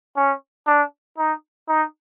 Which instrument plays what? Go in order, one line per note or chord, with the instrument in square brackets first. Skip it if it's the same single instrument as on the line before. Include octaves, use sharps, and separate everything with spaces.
[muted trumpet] C#4
D4
D#4
D#4